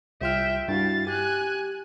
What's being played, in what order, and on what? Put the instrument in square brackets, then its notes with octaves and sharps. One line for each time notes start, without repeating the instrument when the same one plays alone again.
[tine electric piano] C2 F4 F6 [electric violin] E5 G5
[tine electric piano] G2 E4 F#4 [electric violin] F5 A6
[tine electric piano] G4 [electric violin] G#5 F#6